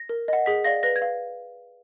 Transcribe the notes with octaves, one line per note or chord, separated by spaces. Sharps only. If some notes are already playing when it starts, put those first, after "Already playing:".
Already playing: A#6
A#4
D#5 F#5
G#4 B6
D5 F5 A#6
B4 A#6
G#6
F5